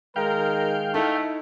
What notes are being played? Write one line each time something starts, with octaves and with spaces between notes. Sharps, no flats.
D#3 G#3 A#4 F5 G5
A3 D#4 E4 A4